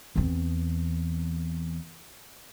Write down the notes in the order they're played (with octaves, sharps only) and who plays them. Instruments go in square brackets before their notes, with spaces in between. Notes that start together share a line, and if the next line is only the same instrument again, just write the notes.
[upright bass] E2 C4